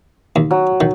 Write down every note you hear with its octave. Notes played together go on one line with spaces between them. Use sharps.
D#2
F#3
D#3